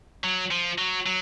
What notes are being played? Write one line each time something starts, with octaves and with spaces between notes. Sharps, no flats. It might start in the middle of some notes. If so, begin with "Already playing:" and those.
F#3
F3
F#3
F#3